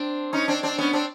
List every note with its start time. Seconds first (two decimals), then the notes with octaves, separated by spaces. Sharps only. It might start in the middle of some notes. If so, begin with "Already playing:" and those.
Already playing: C4 D4
0.33 C#4 D#4
0.48 C4 D4
0.63 C4 D4
0.78 B3 C#4
0.93 C4 D4